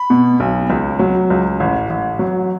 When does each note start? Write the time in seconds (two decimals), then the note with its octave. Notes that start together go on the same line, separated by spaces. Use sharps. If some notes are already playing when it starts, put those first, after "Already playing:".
Already playing: B5
0.10 B2
0.40 B1
0.70 C#2
0.99 F#3
1.30 C#2
1.60 A1
1.90 A1
2.19 F#3